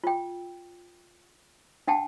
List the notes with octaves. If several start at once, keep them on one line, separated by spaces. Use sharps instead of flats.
F4 G5
D4 F#5 G5 A5